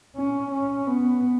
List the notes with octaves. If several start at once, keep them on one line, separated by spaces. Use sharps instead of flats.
C#4
C#4
B3